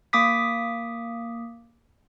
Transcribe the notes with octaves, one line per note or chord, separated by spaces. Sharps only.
A#3 D6 D#6 B6